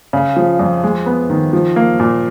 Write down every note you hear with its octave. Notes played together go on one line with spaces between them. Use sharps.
C#3
F3
F2
G#3
B3
D#3
F3
A#3
A#2